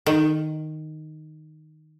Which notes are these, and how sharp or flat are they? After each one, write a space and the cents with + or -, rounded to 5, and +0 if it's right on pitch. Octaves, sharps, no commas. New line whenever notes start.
D#3 -5